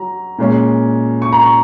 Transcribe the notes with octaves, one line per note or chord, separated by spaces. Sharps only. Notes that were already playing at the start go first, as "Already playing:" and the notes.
Already playing: F#3 A#5
A#2 G#3 C#4
C#6
A#5
C#6